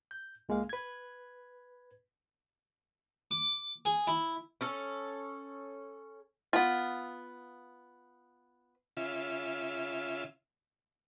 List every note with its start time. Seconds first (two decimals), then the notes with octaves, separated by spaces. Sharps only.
0.11 G6
0.49 C#2 G#3 A#3 F5
0.69 B4 G#6
3.31 D6
3.85 G#4
4.07 E4
4.61 C#4 A4
6.53 B3 F4
8.97 C#3 F4 E5